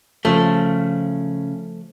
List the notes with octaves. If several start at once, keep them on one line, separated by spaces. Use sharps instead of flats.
C#3 F3 A3